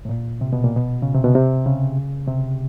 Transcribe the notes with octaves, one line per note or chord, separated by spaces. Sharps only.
A2
A#2
C3
B2
A#2
B2
C#3
C3
B2
C3
C#3
C3